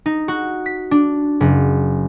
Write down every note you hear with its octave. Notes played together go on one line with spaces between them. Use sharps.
D#4
F#4
B6
D4
F#1